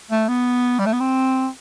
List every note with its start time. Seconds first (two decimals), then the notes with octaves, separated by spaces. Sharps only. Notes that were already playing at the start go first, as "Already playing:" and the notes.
0.11 A3
0.29 B3
0.79 G3
0.86 A3
0.93 B3
1.00 C4